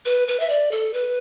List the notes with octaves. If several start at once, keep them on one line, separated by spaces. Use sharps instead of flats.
B4
B4
E5
D5
A4
B4